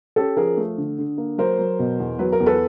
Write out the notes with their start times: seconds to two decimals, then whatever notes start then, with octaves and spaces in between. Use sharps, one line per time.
0.16 C#4 G4 A4
0.37 F3 G#4 A#4
0.57 A3
0.78 D3
0.98 D3
1.18 A#3
1.38 F#3 A#4 C5
1.59 F#3
1.79 B2
2.00 E2
2.19 F#3 B4
2.32 A#4
2.40 E2
2.46 A4 B4